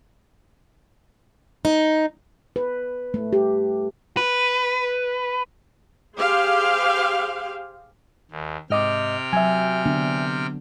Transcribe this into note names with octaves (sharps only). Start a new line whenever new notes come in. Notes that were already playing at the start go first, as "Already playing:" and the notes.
D#4
B4
A3
G4
B4
G4 G#4 C5 F5
D#2
G#2 C3 D#5 G5 D6 F6
F#3 E5 G#5
D3 B3 D4